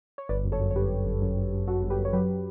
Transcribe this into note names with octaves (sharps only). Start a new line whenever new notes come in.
C#5
G1 B4 D5
F#2
A4 C#5
F#2
C#5
G1 G4 B4
G1
G1
F#2
F#2
F#2
F#2 F#4 A4
G1
G4 B4
F#2
C#5
F#3 G4 B4